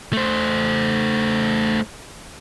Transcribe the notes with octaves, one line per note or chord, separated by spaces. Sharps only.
A3 C5